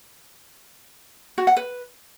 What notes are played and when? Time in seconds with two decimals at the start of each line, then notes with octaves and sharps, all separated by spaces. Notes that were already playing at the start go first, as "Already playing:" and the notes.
1.38 F#4
1.47 F#5
1.57 B4